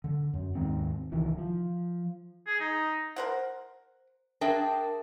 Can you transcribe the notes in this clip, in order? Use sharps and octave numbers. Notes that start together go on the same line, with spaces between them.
D3
F#2
D#2 G#2 D#3 C4
C2 D#3 E3
F3
G#4
D#4
A#4 C5 F#5
D4 G#4 A#4 E5 G5 A5